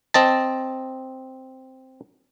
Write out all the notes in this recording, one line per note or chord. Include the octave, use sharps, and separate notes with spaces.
C4 D#5 A5